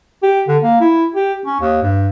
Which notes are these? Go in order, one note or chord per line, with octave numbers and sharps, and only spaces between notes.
G4
D3
A#3
E4
G4
C#4
D#2
G2